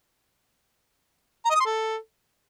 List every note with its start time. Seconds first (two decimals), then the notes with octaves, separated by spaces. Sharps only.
1.45 A#5
1.50 D#5
1.55 D#6
1.60 C6
1.65 A4